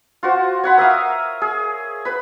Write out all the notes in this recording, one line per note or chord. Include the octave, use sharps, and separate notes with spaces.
F4 F#4 C5
C#5 F#5 B5
A#4 E5 F5 D#6
G#4
B4 B5